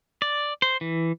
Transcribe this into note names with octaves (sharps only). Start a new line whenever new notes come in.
D5
C5
E3